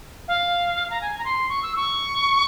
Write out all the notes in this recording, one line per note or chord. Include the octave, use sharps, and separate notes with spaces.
F5
A#5
G#5
A#5
C6
C#6
E6
C#6